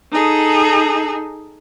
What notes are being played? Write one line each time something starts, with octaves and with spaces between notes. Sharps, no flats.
D#4 G#4 A4